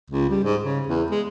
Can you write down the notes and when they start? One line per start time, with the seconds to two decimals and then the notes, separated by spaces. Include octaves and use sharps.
0.10 C#2
0.29 G3
0.44 G#2
0.63 C#3
0.87 E2
1.11 G#3